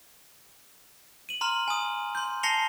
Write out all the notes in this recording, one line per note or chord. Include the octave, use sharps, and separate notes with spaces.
D#7 F#7
A#5 C6 F6
G#5 D#6
C6 G6
A5 A#6 C7 C#7 F7 G7